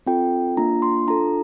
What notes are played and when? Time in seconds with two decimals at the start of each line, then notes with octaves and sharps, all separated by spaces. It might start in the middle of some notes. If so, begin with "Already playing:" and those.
0.06 C4 F4 A4 G5
0.57 A#3 D4 F4 A#5
0.82 C6
1.07 D4 F4 A4 A#5